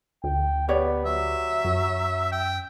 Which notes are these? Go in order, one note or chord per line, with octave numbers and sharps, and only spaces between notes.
D2 G5
B3 G4 C#5 D5
F#3 E5
F#2
G5